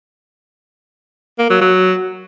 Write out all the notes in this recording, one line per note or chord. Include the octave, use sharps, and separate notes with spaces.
A#3
F#3
F#3